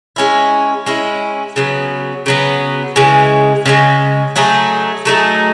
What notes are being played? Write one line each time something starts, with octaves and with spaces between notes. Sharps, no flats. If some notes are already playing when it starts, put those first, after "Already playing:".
G#3 C#4 E4
G#3 C#4 E4
C#3 F#3 B3
C#3 F#3 B3
C#3 E3 G#3
C#3 E3 G#3
F#3 A3 D#4 G#4
F#3 A3 D#4 G#4